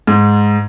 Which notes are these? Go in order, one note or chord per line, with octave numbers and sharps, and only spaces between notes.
G#2